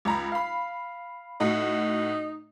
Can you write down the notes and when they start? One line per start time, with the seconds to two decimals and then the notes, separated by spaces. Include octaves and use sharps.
0.05 C#2 A#5 B5
0.32 F5 B5
1.40 A2 D#4 F#4